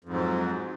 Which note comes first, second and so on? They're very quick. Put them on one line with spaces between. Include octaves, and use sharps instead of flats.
F2 G#2 F#3